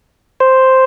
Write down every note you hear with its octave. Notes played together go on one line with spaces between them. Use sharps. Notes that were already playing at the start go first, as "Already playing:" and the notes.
C5